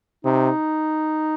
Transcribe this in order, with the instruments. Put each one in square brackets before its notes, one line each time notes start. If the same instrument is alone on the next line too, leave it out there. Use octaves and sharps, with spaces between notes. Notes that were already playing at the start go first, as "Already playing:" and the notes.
[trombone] C3 [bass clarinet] D#4